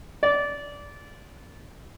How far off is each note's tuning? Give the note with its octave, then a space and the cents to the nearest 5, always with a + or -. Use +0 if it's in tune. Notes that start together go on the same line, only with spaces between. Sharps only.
D5 -20